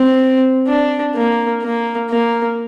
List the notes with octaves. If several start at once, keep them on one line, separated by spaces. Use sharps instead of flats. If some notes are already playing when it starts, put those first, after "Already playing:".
Already playing: C4
D4
A#3
A#3
A#3